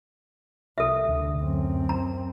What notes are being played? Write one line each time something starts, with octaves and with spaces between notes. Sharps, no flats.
C2 A4 E5
D2 D3
F#2 C4
A#5